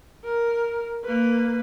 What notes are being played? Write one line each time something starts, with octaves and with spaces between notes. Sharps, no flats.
A#4
A#3 B4